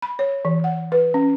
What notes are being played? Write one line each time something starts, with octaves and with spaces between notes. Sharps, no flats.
B5
C#5
E3
F#5
B4
C#4